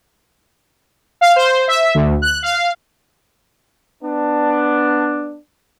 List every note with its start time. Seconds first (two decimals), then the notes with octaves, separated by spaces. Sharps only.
1.21 F5
1.36 C5
1.68 E5
1.95 D2
2.22 F#6
2.42 F5
4.03 B3 D4